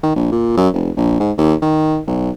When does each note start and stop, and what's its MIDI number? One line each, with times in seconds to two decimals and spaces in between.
0.03 0.13 51
0.16 0.31 34
0.32 0.56 46
0.57 0.68 42
0.73 0.91 29
0.97 1.15 34
1.20 1.31 44
1.38 1.54 39
1.62 2.00 51
2.07 2.30 35